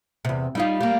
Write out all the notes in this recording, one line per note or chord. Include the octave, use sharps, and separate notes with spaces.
E2 C3
G3 D#4 F4
G3 A#3